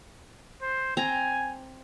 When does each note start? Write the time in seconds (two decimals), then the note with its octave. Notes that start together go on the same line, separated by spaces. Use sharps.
0.62 C5
0.97 C4 G#5 A#5